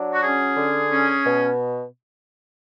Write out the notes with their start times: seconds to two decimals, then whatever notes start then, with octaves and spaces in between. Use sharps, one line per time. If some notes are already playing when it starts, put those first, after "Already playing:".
Already playing: F#3 D4
0.13 F#4
0.22 C#4 G#4
0.56 D3
0.90 C#4
1.25 B2